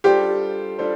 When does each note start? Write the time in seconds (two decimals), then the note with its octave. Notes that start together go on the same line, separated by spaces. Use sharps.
0.04 G3 D4 F4 G4 A4 C5
0.79 G3 D4 F4 A4 C5